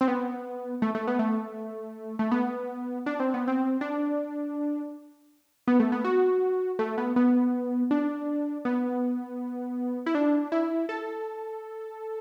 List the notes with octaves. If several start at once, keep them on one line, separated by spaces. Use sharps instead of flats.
C4
B3
A3
A3
B3
A3
A3
B3
D4
C4
B3
C4
D4
B3
A3
B3
F#4
A3
B3
B3
D4
B3
E4
D4
E4
A4